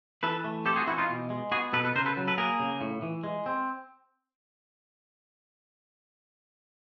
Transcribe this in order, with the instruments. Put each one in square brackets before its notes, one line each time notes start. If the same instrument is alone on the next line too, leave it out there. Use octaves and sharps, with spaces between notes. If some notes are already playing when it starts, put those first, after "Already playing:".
[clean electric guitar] E3 A4 B4
A3
C4 G4 A4
F#4 G#4
E3 E4 F#4
D#4 F4
B2
G#3
B3 F#4 G#4
B2 A4 B4
A4 B4
C#3 A#4 C5
A4 B4
F#3
A4 B4
A#3 G#4 A#4
C#3
A2
E3
G#3
C4